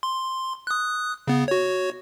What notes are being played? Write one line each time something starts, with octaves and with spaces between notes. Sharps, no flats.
C6
D#6 F#6
C#3 B3
F#4 C#5